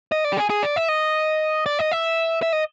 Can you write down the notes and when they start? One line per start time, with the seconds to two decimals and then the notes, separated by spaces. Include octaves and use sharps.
0.12 D#5
0.25 D5
0.32 G4
0.37 G#4
0.50 G#4
0.63 D5
0.76 E5
0.89 D#5
1.66 D5
1.79 D#5
1.92 E5
2.43 E5
2.53 D#5